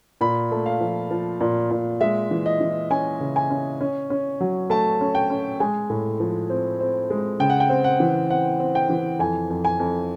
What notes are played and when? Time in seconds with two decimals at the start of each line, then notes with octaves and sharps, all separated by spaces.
0.21 A#2 B5
0.51 A3
0.66 F5
0.81 F3
1.11 F3
1.41 A#2
1.71 A#2
2.01 G#3 E5
2.31 E3
2.46 D#5
2.61 E3
2.90 C#4 G#5
3.20 C#3
3.36 G#5
3.50 C#4
3.81 C#4
4.10 C#4
4.40 F#3
4.70 A3 A5
5.01 C#4
5.15 G5
5.30 C#4
5.60 G#3 G#5
5.90 A2
6.20 F3
6.50 C4
6.80 C4
7.10 G#3
7.40 C#3 G5
7.50 F#5
7.60 G5
7.69 C4
7.84 F#5
8.00 E3
8.29 C4 F#5
8.60 C4
8.75 G5
8.90 E3
9.19 F2 G#5
9.50 F2
9.65 G#5
9.80 F2